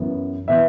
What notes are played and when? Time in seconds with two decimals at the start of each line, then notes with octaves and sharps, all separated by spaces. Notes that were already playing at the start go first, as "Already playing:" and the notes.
Already playing: F#2 E3 B3
0.48 E3 B3 E5